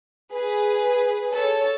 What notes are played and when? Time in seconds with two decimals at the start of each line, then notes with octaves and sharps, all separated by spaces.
0.34 G#4 B4
1.33 A4 C#5